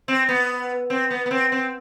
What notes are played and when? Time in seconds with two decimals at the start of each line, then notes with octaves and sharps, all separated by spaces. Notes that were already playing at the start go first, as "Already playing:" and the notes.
0.08 C4
0.29 B3
0.90 C4
1.10 B3
1.26 B3
1.31 C4
1.52 C4